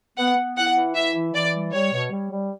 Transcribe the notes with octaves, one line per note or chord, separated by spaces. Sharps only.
B3 F#5
B3
E4 F#5
E3
E4 E5
E3
E3 D5
G3
G3 C#5
B2
G3
G3